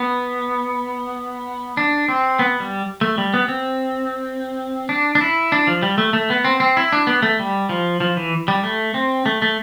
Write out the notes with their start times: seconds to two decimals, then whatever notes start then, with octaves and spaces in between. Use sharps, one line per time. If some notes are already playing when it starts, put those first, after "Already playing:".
Already playing: B3
1.77 D4
2.08 C4
2.39 B3
2.60 G3
3.01 A3
3.18 G3
3.34 B3
3.48 C4
4.89 D4
5.15 D4
5.21 E4
5.52 D4
5.67 F3
5.83 G3
5.98 A3
6.13 A3
6.30 B3
6.45 C4
6.60 C4
6.77 E4
6.92 D4
7.07 B3
7.22 A3
7.39 G3
7.69 F3
8.00 F3
8.17 E3
8.48 G3
8.64 A3
8.94 C4
9.26 A3
9.42 A3